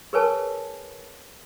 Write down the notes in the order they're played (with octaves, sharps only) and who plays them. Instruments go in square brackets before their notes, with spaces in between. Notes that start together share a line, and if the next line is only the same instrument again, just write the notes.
[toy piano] G#4 A#4 B4 C#5 G#5 A5